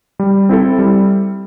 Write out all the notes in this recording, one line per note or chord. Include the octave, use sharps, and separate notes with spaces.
G3
C4 E4 A4
G3